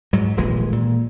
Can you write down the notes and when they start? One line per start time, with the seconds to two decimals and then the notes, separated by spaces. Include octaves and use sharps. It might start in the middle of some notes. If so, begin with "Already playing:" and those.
0.13 G#2 F#3
0.37 D#1 A#1 E3 G#3
0.72 A#2